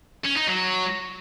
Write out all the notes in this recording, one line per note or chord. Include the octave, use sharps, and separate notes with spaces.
C#4
D#4
F#3